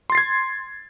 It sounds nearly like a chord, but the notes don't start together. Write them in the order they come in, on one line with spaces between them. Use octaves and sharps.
C6 A6 C7 G#6